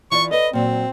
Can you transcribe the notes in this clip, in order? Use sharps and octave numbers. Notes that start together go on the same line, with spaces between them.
E3 F4 D5 C#6
A4 B4 D#5
A#2 F#3 C4